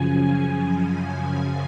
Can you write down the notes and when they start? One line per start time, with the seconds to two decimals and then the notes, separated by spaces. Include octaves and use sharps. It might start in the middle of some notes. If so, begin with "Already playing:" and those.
Already playing: F#2 C#3 F3 G#5